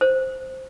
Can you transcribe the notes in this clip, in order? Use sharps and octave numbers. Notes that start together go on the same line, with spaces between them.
C5